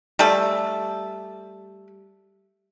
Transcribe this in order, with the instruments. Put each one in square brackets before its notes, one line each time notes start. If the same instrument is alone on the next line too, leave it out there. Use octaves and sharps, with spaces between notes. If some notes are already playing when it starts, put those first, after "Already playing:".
[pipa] G3 A3 A4